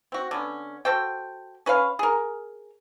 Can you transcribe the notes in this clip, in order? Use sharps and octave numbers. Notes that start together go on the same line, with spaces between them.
C4 F#4
D3 B3 C#4
F#4 A4 C5 G5
C#4 B4 C#5 F5
G#4 A#4